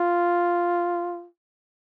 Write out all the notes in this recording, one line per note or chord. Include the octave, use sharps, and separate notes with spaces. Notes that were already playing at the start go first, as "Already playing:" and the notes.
Already playing: F4